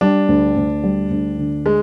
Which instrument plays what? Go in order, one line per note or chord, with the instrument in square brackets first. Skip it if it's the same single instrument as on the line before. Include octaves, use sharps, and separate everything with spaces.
[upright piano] G3 [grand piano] D4
[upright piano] D2
D2
G3
D2
D3
[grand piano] G#3